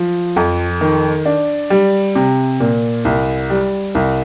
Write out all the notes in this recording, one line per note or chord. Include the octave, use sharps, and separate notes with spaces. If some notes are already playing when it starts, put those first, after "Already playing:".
Already playing: F3
F2
D#3
D4
G3
C3
A#2
C2
G3
C2